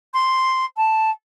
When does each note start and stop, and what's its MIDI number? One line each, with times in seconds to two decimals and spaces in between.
0.13 0.65 84
0.77 1.10 81